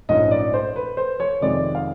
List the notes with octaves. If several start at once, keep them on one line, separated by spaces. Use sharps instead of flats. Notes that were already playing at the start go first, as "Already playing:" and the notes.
A#1 G#2 F3 A3 C#4 D#5
D5
C5
B4
C5
C#5
F2 C3 D#3 G#3 D5
F5